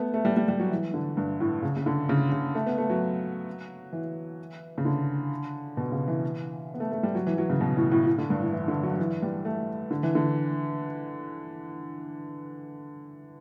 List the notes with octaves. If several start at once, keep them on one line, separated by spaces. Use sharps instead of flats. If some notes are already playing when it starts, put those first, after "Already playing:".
Already playing: A3 B3
A3
G3
G3
G3
F#3
E3
D3
G2
A2
C#3
C#3
D3
C#3
C#3
A3
B3
A3
F#3
E3
C#3
D3
B2
C#3
E3
B3
A3
A3
G3
F#3
E3
F#3
C#3
B2
A2
A2
A2
D3
G2
A2
E3
D3
F#3
F#3
E3
G3
A3
D3
E3
D3